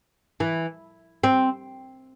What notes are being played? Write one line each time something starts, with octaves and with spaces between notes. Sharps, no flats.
E3
C4